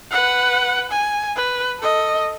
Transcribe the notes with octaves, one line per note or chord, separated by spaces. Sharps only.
B4 F#5
G#5
B4
A4 D#5